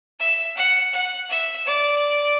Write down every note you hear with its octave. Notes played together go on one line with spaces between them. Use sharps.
E5
F#5
F#5
E5
D5